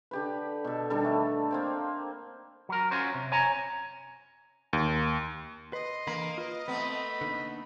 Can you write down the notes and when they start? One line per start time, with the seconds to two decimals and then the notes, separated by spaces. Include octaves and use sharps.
0.11 D3 G4 B4
0.64 B2 A4
0.90 D3 D#3 G3 A4
1.05 A3
1.51 A#3 C4 G5
2.69 F#3 A#4
2.91 C#4 F4 F#4 C5
3.14 C3
3.32 C#5 G#5 A#5
4.73 D#2
5.73 B4 D#5 C6
6.07 D3 E3 A#3 B5
6.38 F4 B4
6.68 A3 B3 C4 B5
7.21 D3 A#3 D#4